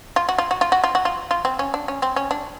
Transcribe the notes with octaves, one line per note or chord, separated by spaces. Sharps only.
F4
F#4
F4
F#4
F4
F#4
F4
F#4
F4
F4
C4
C#4
D4
C#4
C4
C#4
D4